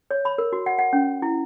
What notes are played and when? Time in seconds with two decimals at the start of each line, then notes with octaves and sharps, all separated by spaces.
0.11 C#5
0.25 B5
0.38 A#4
0.52 F#4
0.66 F#5
0.79 F#5
0.93 C#4
1.22 E4